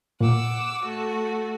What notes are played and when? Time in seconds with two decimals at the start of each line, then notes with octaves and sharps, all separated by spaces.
0.20 A#2 F#5 D6 E6
0.82 A3 F#4